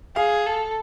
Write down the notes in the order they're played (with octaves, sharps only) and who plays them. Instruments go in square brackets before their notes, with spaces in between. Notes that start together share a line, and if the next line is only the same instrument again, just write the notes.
[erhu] G#4 [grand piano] F5
[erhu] A4